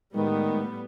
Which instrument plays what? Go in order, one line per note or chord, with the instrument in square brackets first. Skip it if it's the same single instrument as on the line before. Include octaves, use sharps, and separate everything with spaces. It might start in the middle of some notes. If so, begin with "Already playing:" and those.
[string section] A2 G3 B3 [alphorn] D#3 [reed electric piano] G#3